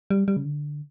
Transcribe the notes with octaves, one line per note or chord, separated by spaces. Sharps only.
G3
G3
C#3
D3